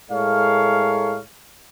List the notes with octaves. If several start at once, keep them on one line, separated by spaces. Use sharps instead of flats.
A2 G#3 A3 A#4 C#5 F5